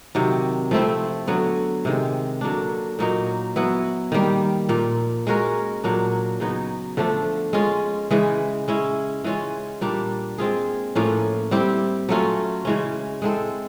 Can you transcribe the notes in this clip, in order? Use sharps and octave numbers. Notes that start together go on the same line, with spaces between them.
C3 D#3 F#3
F3 A3 C4 E4
D3 F#3 B3
C3 D#3 G#3
D3 F#3 A#3 D4
A#2 F#3 A#3 D#4
F#3 B3 E4
D#3 G3 A#3
A#2 F3 A#3
G#3 C#4 F#4 A#4
A#2 F#3 A#3 D4
C#3 F#3 B3 D#4
D3 F3 A3 D4
G#3 C#4 F4
C#3 E3 G#3
G#3 C#4 E4
E3 G#3 C#4 F4
A#2 G3 A#3 D4
G#3 C4 F4 G#4
A2 F3 A#3 C#4
G3 C4 E4 G4
F#3 A3 C#4 F4
C#3 E3 G#3 C#4
G#3 C4 E4 A4